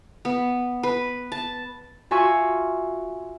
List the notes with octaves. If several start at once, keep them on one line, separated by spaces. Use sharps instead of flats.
B3
B4
A5
F4 F#4 E5 G#5 C#6